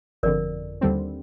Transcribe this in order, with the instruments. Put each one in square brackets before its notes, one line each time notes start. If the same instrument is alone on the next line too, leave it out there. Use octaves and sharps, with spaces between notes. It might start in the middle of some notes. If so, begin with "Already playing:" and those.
[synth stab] G1 F2 D3 [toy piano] A#4 D5
[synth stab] D#2 D3 G3 C4